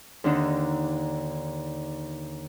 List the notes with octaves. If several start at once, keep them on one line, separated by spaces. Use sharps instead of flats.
D#2 D3 D4 D#4